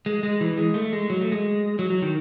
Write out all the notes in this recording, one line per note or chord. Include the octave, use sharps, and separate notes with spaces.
G#3
G#3
E3
G#3
A3
G#3
F#3
A3
G#3
F#3
F#3
D#3